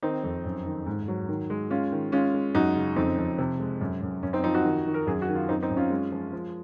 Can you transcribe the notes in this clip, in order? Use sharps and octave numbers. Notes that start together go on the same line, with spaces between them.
D#3 C4 D#4
F2
F#2
D#3
G#2
F#3
D#3
G#3
G#3 C#4 F4
D#3
G#3 C#4 F4
G#3
F#2 D#4 F#4
C#3
F2 C4 D#4
F2
C3
G#3
F#2
F#2
F#2 C#4
C4 D#4
F3 C4 D#4
D#4 F#4
D#3
D#3
A#4
F#2 G#4
F#4
D#3
F4
F#2 C4 D#4
C4 D#4
F#2
C#4 F4
G#3
F3
F3